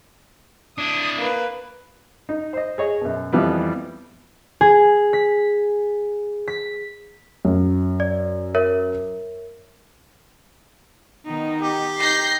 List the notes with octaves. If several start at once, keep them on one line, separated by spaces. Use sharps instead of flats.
D4 E4 D#6
A#3 B4
D#4
C5 D#5
G#4 C#5 D#5
F#2 B2
F2 E3 F3 G3 B3
G#4
B6
B6
F#2
D5
A#4 C#5 E5
D#3 B3 D#4
G4
D#4 G6 A#6 C7